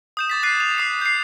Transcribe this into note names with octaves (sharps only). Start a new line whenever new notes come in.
D#6 G6 E7
D6 A6 B6
D6 F#6 A6 C7 D#7
F7
D#6 C7
G6 C7